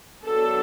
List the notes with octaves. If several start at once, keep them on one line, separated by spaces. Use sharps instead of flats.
F#3 B3 D4 A4